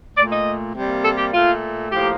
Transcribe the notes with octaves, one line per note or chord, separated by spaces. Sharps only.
A#2 A3 D5
D#5
C3 G3 A#3
A4
G4
A#2 A3 F4
A2 F3 A#3 G4